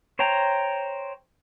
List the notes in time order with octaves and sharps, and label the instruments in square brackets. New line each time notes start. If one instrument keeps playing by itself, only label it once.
[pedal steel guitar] C5 C#5 G5 A#5